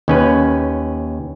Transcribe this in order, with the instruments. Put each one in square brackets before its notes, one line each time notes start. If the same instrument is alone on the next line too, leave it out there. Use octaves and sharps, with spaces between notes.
[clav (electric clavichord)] D#2 C#4 B4